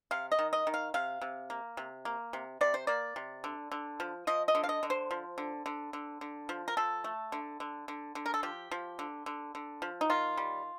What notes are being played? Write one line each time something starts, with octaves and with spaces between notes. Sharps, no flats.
C3 F5
D#5
D#3
D#5
D#3
F5
C3 F5
C3
A#3
C3
A#3
C3
C3 D5
C5
A#3 D5
C3
D3
D3
F3
F3 D#5
D#5
D3
F5
D#5
D3
C5
F3
D3
D3
D3
D3
F3
A#4
F3 A4
A3
D3
D3
D3
D3
A#4
A4
F3 G4
F3
D3
D3
D3
F3
D#4
D#3 F4
G3